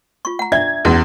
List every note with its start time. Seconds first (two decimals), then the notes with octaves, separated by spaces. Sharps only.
0.25 F4 C#6
0.39 F#5 A#5
0.52 D4 D5 E5 G#6
0.85 E2 C#4 F#4 F#5